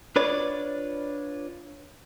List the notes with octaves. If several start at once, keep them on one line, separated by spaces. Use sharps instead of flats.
D4 F4 B4 C#5 D5